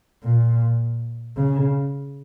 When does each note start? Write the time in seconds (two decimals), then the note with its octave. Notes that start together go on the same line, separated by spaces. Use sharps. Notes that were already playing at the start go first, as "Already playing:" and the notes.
0.24 A#2
1.37 C#3